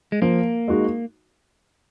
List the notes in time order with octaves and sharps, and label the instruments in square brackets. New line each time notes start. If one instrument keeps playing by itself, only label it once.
[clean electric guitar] G#3
[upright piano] F3 [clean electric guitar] A#3
[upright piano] G#3 D#4 F#4